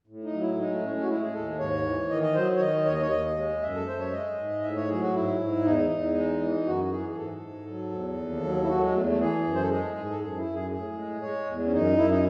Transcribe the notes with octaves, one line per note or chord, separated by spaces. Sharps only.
A2
D#4
F#3
E4
G#3 D#4
A3
A2 C#4
C#4
F#4
G#3 E4
G#4
D#2 A4
G#2 C#5
E3
D#3 D#5
D#5
F#3 C5
C#5
D#3 D#5
D#2 C#5
D#5
C#5
D#2 D#5
G#3
F#2 E5
A4
F#2 C5
C#5
G#3 D#5
G#2
A2 E5
C#5
F#3 G#4
F#4
G#2 E4
G#2
E2 D#4
E2
G#3
E3
F#2 F#4
F#4
E3 G#4
G#4
G#2 A4
G#2
F#3
E2
D#2
F#3
E4
F#3 F#4
G#3
E2 A3
A3
E3 G#4
F#2
C5
A4
G#3 G#4
G#2
A4
F#2 G#4
E4
F#2
G#4
A2 G#4
G#3
G#3 C#5
E2
C#4
F#2 D#4
F#2 E4
D#4